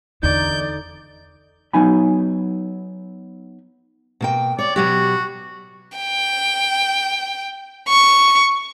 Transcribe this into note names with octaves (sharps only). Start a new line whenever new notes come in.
E2 D3 D#4 D5 G6
F#3 B3 D#4 G#5 B5
B2 A#3 G5
C#5 D5
B2 F#3 F#4 G4
G5
C#6